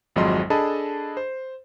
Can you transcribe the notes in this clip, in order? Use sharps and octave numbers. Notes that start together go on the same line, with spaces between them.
G#1 F2 F#3 G#3 D#5 C6
D4 G#4 A4 D#5 A5 B5
C5